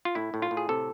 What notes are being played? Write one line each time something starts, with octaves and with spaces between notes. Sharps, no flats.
F4
A2 E4
A2
F4
A2
G#4
C3 A4